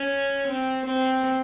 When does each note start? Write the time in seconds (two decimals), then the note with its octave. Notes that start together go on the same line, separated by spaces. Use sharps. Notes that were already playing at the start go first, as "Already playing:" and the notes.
Already playing: C#4
0.47 C4
0.86 C4